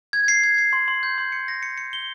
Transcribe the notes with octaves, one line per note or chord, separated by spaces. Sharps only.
G#6
C7
G#6
C7
C6
C6
G6
C6
C#7
A#6
C#7
C#7
G7